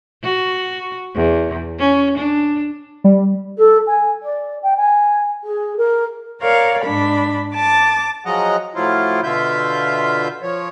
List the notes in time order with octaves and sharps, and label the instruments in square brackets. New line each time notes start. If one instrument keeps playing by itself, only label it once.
[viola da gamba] F#4
E2
C#4
D4
[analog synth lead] G3
[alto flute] A4
G#5
D5
G5
G#5
G#4
A#4
[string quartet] A#4 C#5 D5 F5
G#2 D4 B5
A5 D6 A6
[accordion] F3 F#3 G#3 D#5 F#5 A#5
A2 F3 F#3 E4 F4
B2 D3 F4 E5 G6
F3 C#5